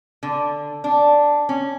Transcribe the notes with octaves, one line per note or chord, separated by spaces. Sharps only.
D3
D4
C#4